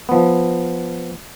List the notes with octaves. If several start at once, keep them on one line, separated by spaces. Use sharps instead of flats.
F3 B3